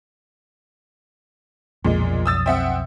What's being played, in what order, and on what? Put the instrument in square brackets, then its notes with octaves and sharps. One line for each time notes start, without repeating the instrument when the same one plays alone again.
[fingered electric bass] B1 F2 [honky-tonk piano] A#2 G#3
[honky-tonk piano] D#6 E6 A6
C4 E5 F#5